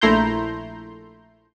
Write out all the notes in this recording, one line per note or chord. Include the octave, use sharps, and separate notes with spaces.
A#1 A3 E4 A#5 C6 G6